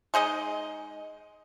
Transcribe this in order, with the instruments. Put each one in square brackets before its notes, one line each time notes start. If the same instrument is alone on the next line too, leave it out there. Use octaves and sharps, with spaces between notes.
[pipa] G#3 D#4 G#4 D#5